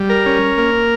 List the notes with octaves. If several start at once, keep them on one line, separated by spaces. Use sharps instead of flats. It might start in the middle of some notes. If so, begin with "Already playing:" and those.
Already playing: G3
A#4
C#4
A#3